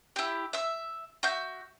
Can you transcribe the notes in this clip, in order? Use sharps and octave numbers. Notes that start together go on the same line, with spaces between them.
E4 G4
E5 E6
F#4 E5 G6